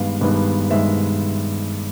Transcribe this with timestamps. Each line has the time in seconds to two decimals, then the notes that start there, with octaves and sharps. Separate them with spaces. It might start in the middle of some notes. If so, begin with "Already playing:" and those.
Already playing: G2 D#3 G#3 B3 F5
0.21 G2 D#3 G#3 B3
0.70 G2 D#3 G#3 B3 E5